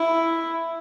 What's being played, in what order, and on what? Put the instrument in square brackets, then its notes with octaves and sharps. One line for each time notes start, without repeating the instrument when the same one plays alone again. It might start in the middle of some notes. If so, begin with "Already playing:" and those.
Already playing: [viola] E4